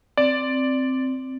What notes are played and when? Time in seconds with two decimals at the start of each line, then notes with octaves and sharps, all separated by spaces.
0.17 C4 D5